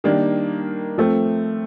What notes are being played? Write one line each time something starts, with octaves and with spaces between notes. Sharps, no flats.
D#3 G3 A#3 D4
F3 A3 C4